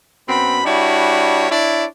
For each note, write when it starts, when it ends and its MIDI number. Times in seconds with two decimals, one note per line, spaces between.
0.28 0.61 42
0.28 0.61 59
0.28 0.61 60
0.28 0.61 83
0.65 1.49 55
0.65 1.49 62
0.65 1.49 64
0.65 1.49 66
0.65 1.49 73
1.50 1.85 62
1.50 1.85 64
1.50 1.85 73
1.50 1.85 74